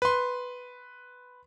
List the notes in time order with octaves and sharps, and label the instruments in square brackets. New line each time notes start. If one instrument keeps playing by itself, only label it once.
[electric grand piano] B4 C6